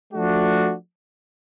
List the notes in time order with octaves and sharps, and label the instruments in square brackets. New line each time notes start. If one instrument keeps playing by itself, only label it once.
[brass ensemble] F3 A3 D4 F#4